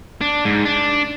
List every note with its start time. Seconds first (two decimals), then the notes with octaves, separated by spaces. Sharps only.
0.21 D4
0.45 G#2
0.65 D4